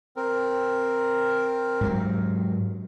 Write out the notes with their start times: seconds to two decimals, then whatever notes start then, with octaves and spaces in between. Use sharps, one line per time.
0.16 C4 A#4
1.81 G#2 F#3